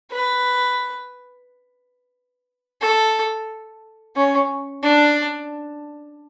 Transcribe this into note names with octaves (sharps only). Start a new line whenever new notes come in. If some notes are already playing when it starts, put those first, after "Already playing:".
B4
A4
C#4
D4